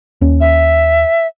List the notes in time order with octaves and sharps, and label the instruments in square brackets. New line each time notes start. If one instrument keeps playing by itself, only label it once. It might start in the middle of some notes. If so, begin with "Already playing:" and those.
[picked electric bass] D#2 C#4
[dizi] E5